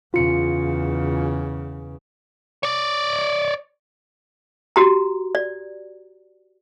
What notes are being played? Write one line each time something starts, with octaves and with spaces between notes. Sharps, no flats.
E2 C#3 F4 C#7
C#5 D5
F#4 G4 A#5
D5